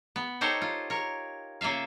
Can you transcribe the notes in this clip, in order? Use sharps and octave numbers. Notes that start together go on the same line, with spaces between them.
B3
D#4 G4 A4 A#4 C5 C#5
F4
A#4 C#5
C#3 A#3 F4 E5 F5